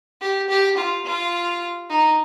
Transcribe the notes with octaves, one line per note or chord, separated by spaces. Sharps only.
G4
G4
F4
F4
D#4